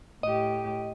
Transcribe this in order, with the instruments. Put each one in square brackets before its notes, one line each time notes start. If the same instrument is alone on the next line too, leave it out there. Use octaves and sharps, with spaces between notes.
[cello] A2 G4 [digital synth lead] D#5